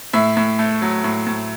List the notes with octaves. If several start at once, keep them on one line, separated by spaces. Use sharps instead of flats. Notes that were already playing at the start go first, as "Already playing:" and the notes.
A2 E5
A2
A3
F#3
A2
A2